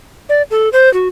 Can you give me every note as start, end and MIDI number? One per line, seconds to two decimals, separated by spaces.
0.29 0.42 74
0.51 0.69 69
0.73 0.92 72
0.94 1.08 66